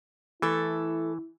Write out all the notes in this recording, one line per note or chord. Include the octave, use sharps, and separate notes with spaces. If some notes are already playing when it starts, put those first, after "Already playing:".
E3 A3 E4 A4